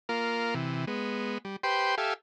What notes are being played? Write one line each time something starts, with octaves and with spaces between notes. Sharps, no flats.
A#3 F4 A#4
C3 E3
G#3 B3
G3
G4 B4 C5 G5 C6
G4 A4 E5 F5 G#5